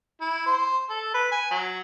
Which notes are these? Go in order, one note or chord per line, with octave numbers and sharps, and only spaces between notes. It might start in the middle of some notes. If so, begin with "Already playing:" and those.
E4
C5
A4
B4
G#5
F#3